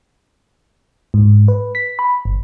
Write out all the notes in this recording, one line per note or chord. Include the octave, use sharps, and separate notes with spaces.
G#2
B4
B6
B5
G1